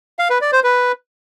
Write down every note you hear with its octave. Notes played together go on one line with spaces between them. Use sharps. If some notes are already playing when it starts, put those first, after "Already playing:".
F5
B4
D5
C5
B4